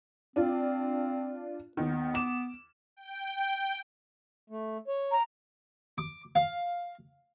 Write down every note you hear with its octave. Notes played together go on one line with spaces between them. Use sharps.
C4 D4 F4
D#2 D#3 B3
D6 E7
G5
A3
C#5
A#5
D6
F5